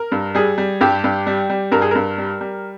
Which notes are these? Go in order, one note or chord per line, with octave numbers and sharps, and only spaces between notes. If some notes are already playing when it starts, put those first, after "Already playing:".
Already playing: A#4
G2
G3 G#4
G3
G2 G4
G2
G3
G3
G2 A#4
G#4
G2 A#4
G3
G3